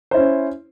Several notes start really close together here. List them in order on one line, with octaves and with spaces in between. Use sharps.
C5 E4 C#4